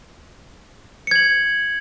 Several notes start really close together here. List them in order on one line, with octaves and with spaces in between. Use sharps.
C#7 G#6 F#7